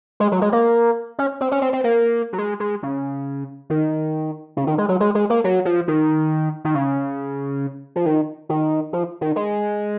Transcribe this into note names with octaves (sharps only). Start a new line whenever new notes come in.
G#3
F#3
G#3
A#3
C#4
C4
C#4
C4
C4
A#3
F#3
G#3
G#3
C#3
D#3
C#3
D#3
G#3
F#3
G#3
G#3
A#3
F#3
F3
D#3
D#3
C#3
F3
D#3
D#3
F3
D#3
G#3